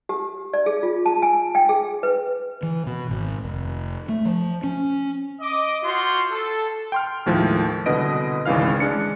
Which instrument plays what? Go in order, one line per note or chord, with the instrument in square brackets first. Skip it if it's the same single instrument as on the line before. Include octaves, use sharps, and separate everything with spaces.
[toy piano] G4
D5
G#4
F4
A5
G#5
G5
G#4
B4
[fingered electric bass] E3
B2
G#1
F1
A3
F3
C#4
[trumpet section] D#5 D6
F4 F#4 C5 C6
A4
[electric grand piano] G5 C6 F6
D#2 A2 F3 G#3
C2 B2 D3 B4 D#5 D7
G#1 C#2 C#3 E3 F5 F6
G#3 D4 C#7